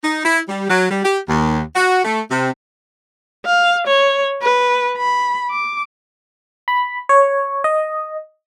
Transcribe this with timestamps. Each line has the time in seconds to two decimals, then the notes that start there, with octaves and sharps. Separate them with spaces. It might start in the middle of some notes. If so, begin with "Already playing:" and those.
0.04 D#4
0.25 E4
0.48 G3
0.70 F#3
0.91 G3
1.04 G4
1.29 D#2
1.76 F#4
2.05 A3
2.31 C3
3.46 F5
3.87 C#5
4.42 B4
4.97 B5
5.51 D6
6.68 B5
7.09 C#5
7.64 D#5